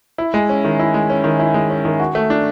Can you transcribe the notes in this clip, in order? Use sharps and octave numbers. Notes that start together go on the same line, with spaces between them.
E4
G#3
C#4
D#3
E4
G#3
C#4
D#3
E4
G#3
C#4
D#3
F#4
A3
D4